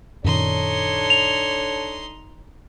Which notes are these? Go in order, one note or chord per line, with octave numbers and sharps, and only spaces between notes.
F#2 A#2 D#3 D4 D#4 A4 C#5 C6
F7